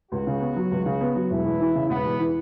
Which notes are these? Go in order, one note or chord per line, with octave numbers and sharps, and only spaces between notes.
C#2 F#4
C#3
B3
F#3
C#2
C#3
B3
F#3
E1 E4
E2
E3
C#3
E1 B3
E2
E3